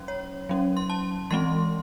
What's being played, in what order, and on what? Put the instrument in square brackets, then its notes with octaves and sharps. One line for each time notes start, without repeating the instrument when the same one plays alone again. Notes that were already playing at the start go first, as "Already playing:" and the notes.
Already playing: [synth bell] F#3 C#4
C#5
F#3 C#4
C6
A5
E3 G#3 C4 C6